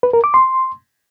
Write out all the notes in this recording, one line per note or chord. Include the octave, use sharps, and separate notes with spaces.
B4
A#4
D6
C6